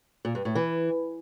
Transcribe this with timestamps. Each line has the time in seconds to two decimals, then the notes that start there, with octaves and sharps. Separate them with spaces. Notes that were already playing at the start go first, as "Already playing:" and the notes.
0.25 A#2
0.35 G2
0.45 A2
0.55 E3